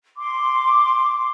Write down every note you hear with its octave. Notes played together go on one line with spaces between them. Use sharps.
C6 D6